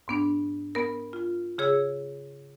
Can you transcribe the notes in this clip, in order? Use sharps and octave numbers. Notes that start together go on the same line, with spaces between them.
G#2 B3 D4
B3 A#4
F4
C#3 G#4 C#5 E6